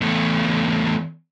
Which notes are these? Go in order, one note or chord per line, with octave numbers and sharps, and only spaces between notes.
E2 A3